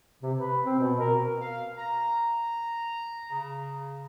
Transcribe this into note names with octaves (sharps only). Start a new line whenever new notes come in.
C3
B4
C4
B2
A#4
F5
A#5
C#3